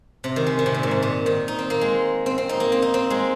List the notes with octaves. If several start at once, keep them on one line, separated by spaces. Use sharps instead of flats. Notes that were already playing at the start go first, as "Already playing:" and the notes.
C3
D#3
G#3
D#3
C3
A#2
G#2
C3
A#2
D#3
D#4
C4
A#3
G#3
C4
C4
D#4
A#3
C4
D#4
C4
G#3